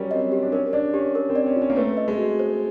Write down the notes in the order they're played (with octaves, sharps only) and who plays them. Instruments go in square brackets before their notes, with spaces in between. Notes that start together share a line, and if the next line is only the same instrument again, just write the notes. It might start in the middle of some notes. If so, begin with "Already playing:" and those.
Already playing: [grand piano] F#3 G3 C#4 [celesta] A#4
[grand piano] C4 [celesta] D#5
[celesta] G4
[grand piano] D4
[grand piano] C#4 [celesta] A#4
[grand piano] D4 [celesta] D5
[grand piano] C#4 [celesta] G4
[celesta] A#4
[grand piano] C4
[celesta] D5
[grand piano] C#4
[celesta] F4
[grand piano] C#4
A#3
[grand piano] A3 [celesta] B4
[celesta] D#5
[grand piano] G#3
[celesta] F#4
C5